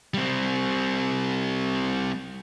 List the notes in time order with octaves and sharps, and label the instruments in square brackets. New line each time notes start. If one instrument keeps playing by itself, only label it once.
[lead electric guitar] G3 C4